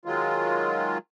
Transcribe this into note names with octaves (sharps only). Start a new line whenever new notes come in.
D#3 F#3 G#3 F4